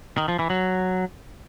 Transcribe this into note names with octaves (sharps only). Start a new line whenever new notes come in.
D#3
F3
E3
F#3